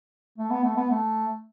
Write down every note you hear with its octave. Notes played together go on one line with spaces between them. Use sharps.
A3
B3
A3
B3
A3